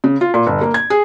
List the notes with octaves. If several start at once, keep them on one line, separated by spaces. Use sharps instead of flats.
C#3
F4
A#2
G1
A#3
G#6
G#4